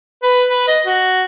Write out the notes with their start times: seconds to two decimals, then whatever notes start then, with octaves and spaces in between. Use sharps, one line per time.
0.23 B4
0.49 B4
0.68 D#5
0.86 F#4